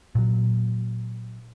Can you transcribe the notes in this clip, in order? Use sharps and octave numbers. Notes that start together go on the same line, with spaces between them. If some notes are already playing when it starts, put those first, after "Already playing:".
A#2 F#3